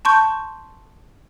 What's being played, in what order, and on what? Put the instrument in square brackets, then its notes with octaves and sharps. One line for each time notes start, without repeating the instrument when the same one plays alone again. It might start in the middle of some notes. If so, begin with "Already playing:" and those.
[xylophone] A5 C6 C#6 G6